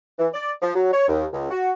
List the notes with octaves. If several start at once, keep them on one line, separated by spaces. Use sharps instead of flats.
E3
D5
F3
F#3
C#5
D#2
C#2
F#4